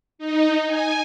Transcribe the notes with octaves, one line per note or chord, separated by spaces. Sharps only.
D#4
G#5